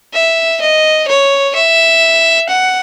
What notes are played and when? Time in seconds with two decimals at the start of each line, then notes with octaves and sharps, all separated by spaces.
0.14 E5
0.61 D#5
1.08 C#5
1.55 E5
2.49 F#5